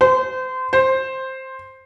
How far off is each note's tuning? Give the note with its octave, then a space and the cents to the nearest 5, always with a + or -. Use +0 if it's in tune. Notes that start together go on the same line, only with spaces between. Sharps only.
C5 -30
C5 +5